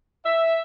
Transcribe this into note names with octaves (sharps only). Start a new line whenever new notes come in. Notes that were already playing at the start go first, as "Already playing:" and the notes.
E5